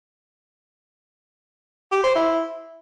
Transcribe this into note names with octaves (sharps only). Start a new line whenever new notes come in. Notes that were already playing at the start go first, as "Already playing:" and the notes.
G4
C5
E4